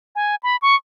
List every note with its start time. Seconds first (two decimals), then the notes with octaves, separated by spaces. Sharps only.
0.16 G#5
0.43 B5
0.62 C#6